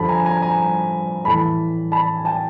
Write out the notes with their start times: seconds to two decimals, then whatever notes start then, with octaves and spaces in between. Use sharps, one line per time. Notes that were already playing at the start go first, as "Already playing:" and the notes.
Already playing: G2 D3 F3 A5 B5
0.09 G#5 A#5
0.25 G#5 A#5
0.42 G#5 A#5
1.25 A2 E3 A5 B5
1.92 A5 B5
2.16 G#5
2.25 G5 A5